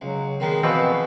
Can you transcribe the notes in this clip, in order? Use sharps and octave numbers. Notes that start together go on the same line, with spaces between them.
C#2 F#3
D#3 G#3 B3 C4
B2 E3 F3 B3 C4